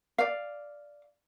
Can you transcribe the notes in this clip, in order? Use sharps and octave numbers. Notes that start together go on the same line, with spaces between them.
D5 F5